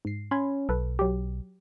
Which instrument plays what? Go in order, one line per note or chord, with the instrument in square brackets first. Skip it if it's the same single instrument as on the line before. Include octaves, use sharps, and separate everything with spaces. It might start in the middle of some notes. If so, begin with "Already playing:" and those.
[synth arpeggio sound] G#2 C7
[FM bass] C#4 [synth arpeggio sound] B5 C6 G#6
[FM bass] B1 [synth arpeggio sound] A4 B4
[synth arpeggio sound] F#3 G4